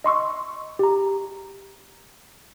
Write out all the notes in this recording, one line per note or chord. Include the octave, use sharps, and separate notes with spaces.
D#5 C6 C#6 E6
G4 A#5